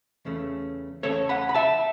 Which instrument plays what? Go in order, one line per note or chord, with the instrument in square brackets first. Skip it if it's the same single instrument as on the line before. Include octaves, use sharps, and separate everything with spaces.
[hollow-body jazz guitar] E2 C#3 A3 C#4
E2 C#3 A3 C#4 A4 C#5
F#5 B5
B5
E5 A5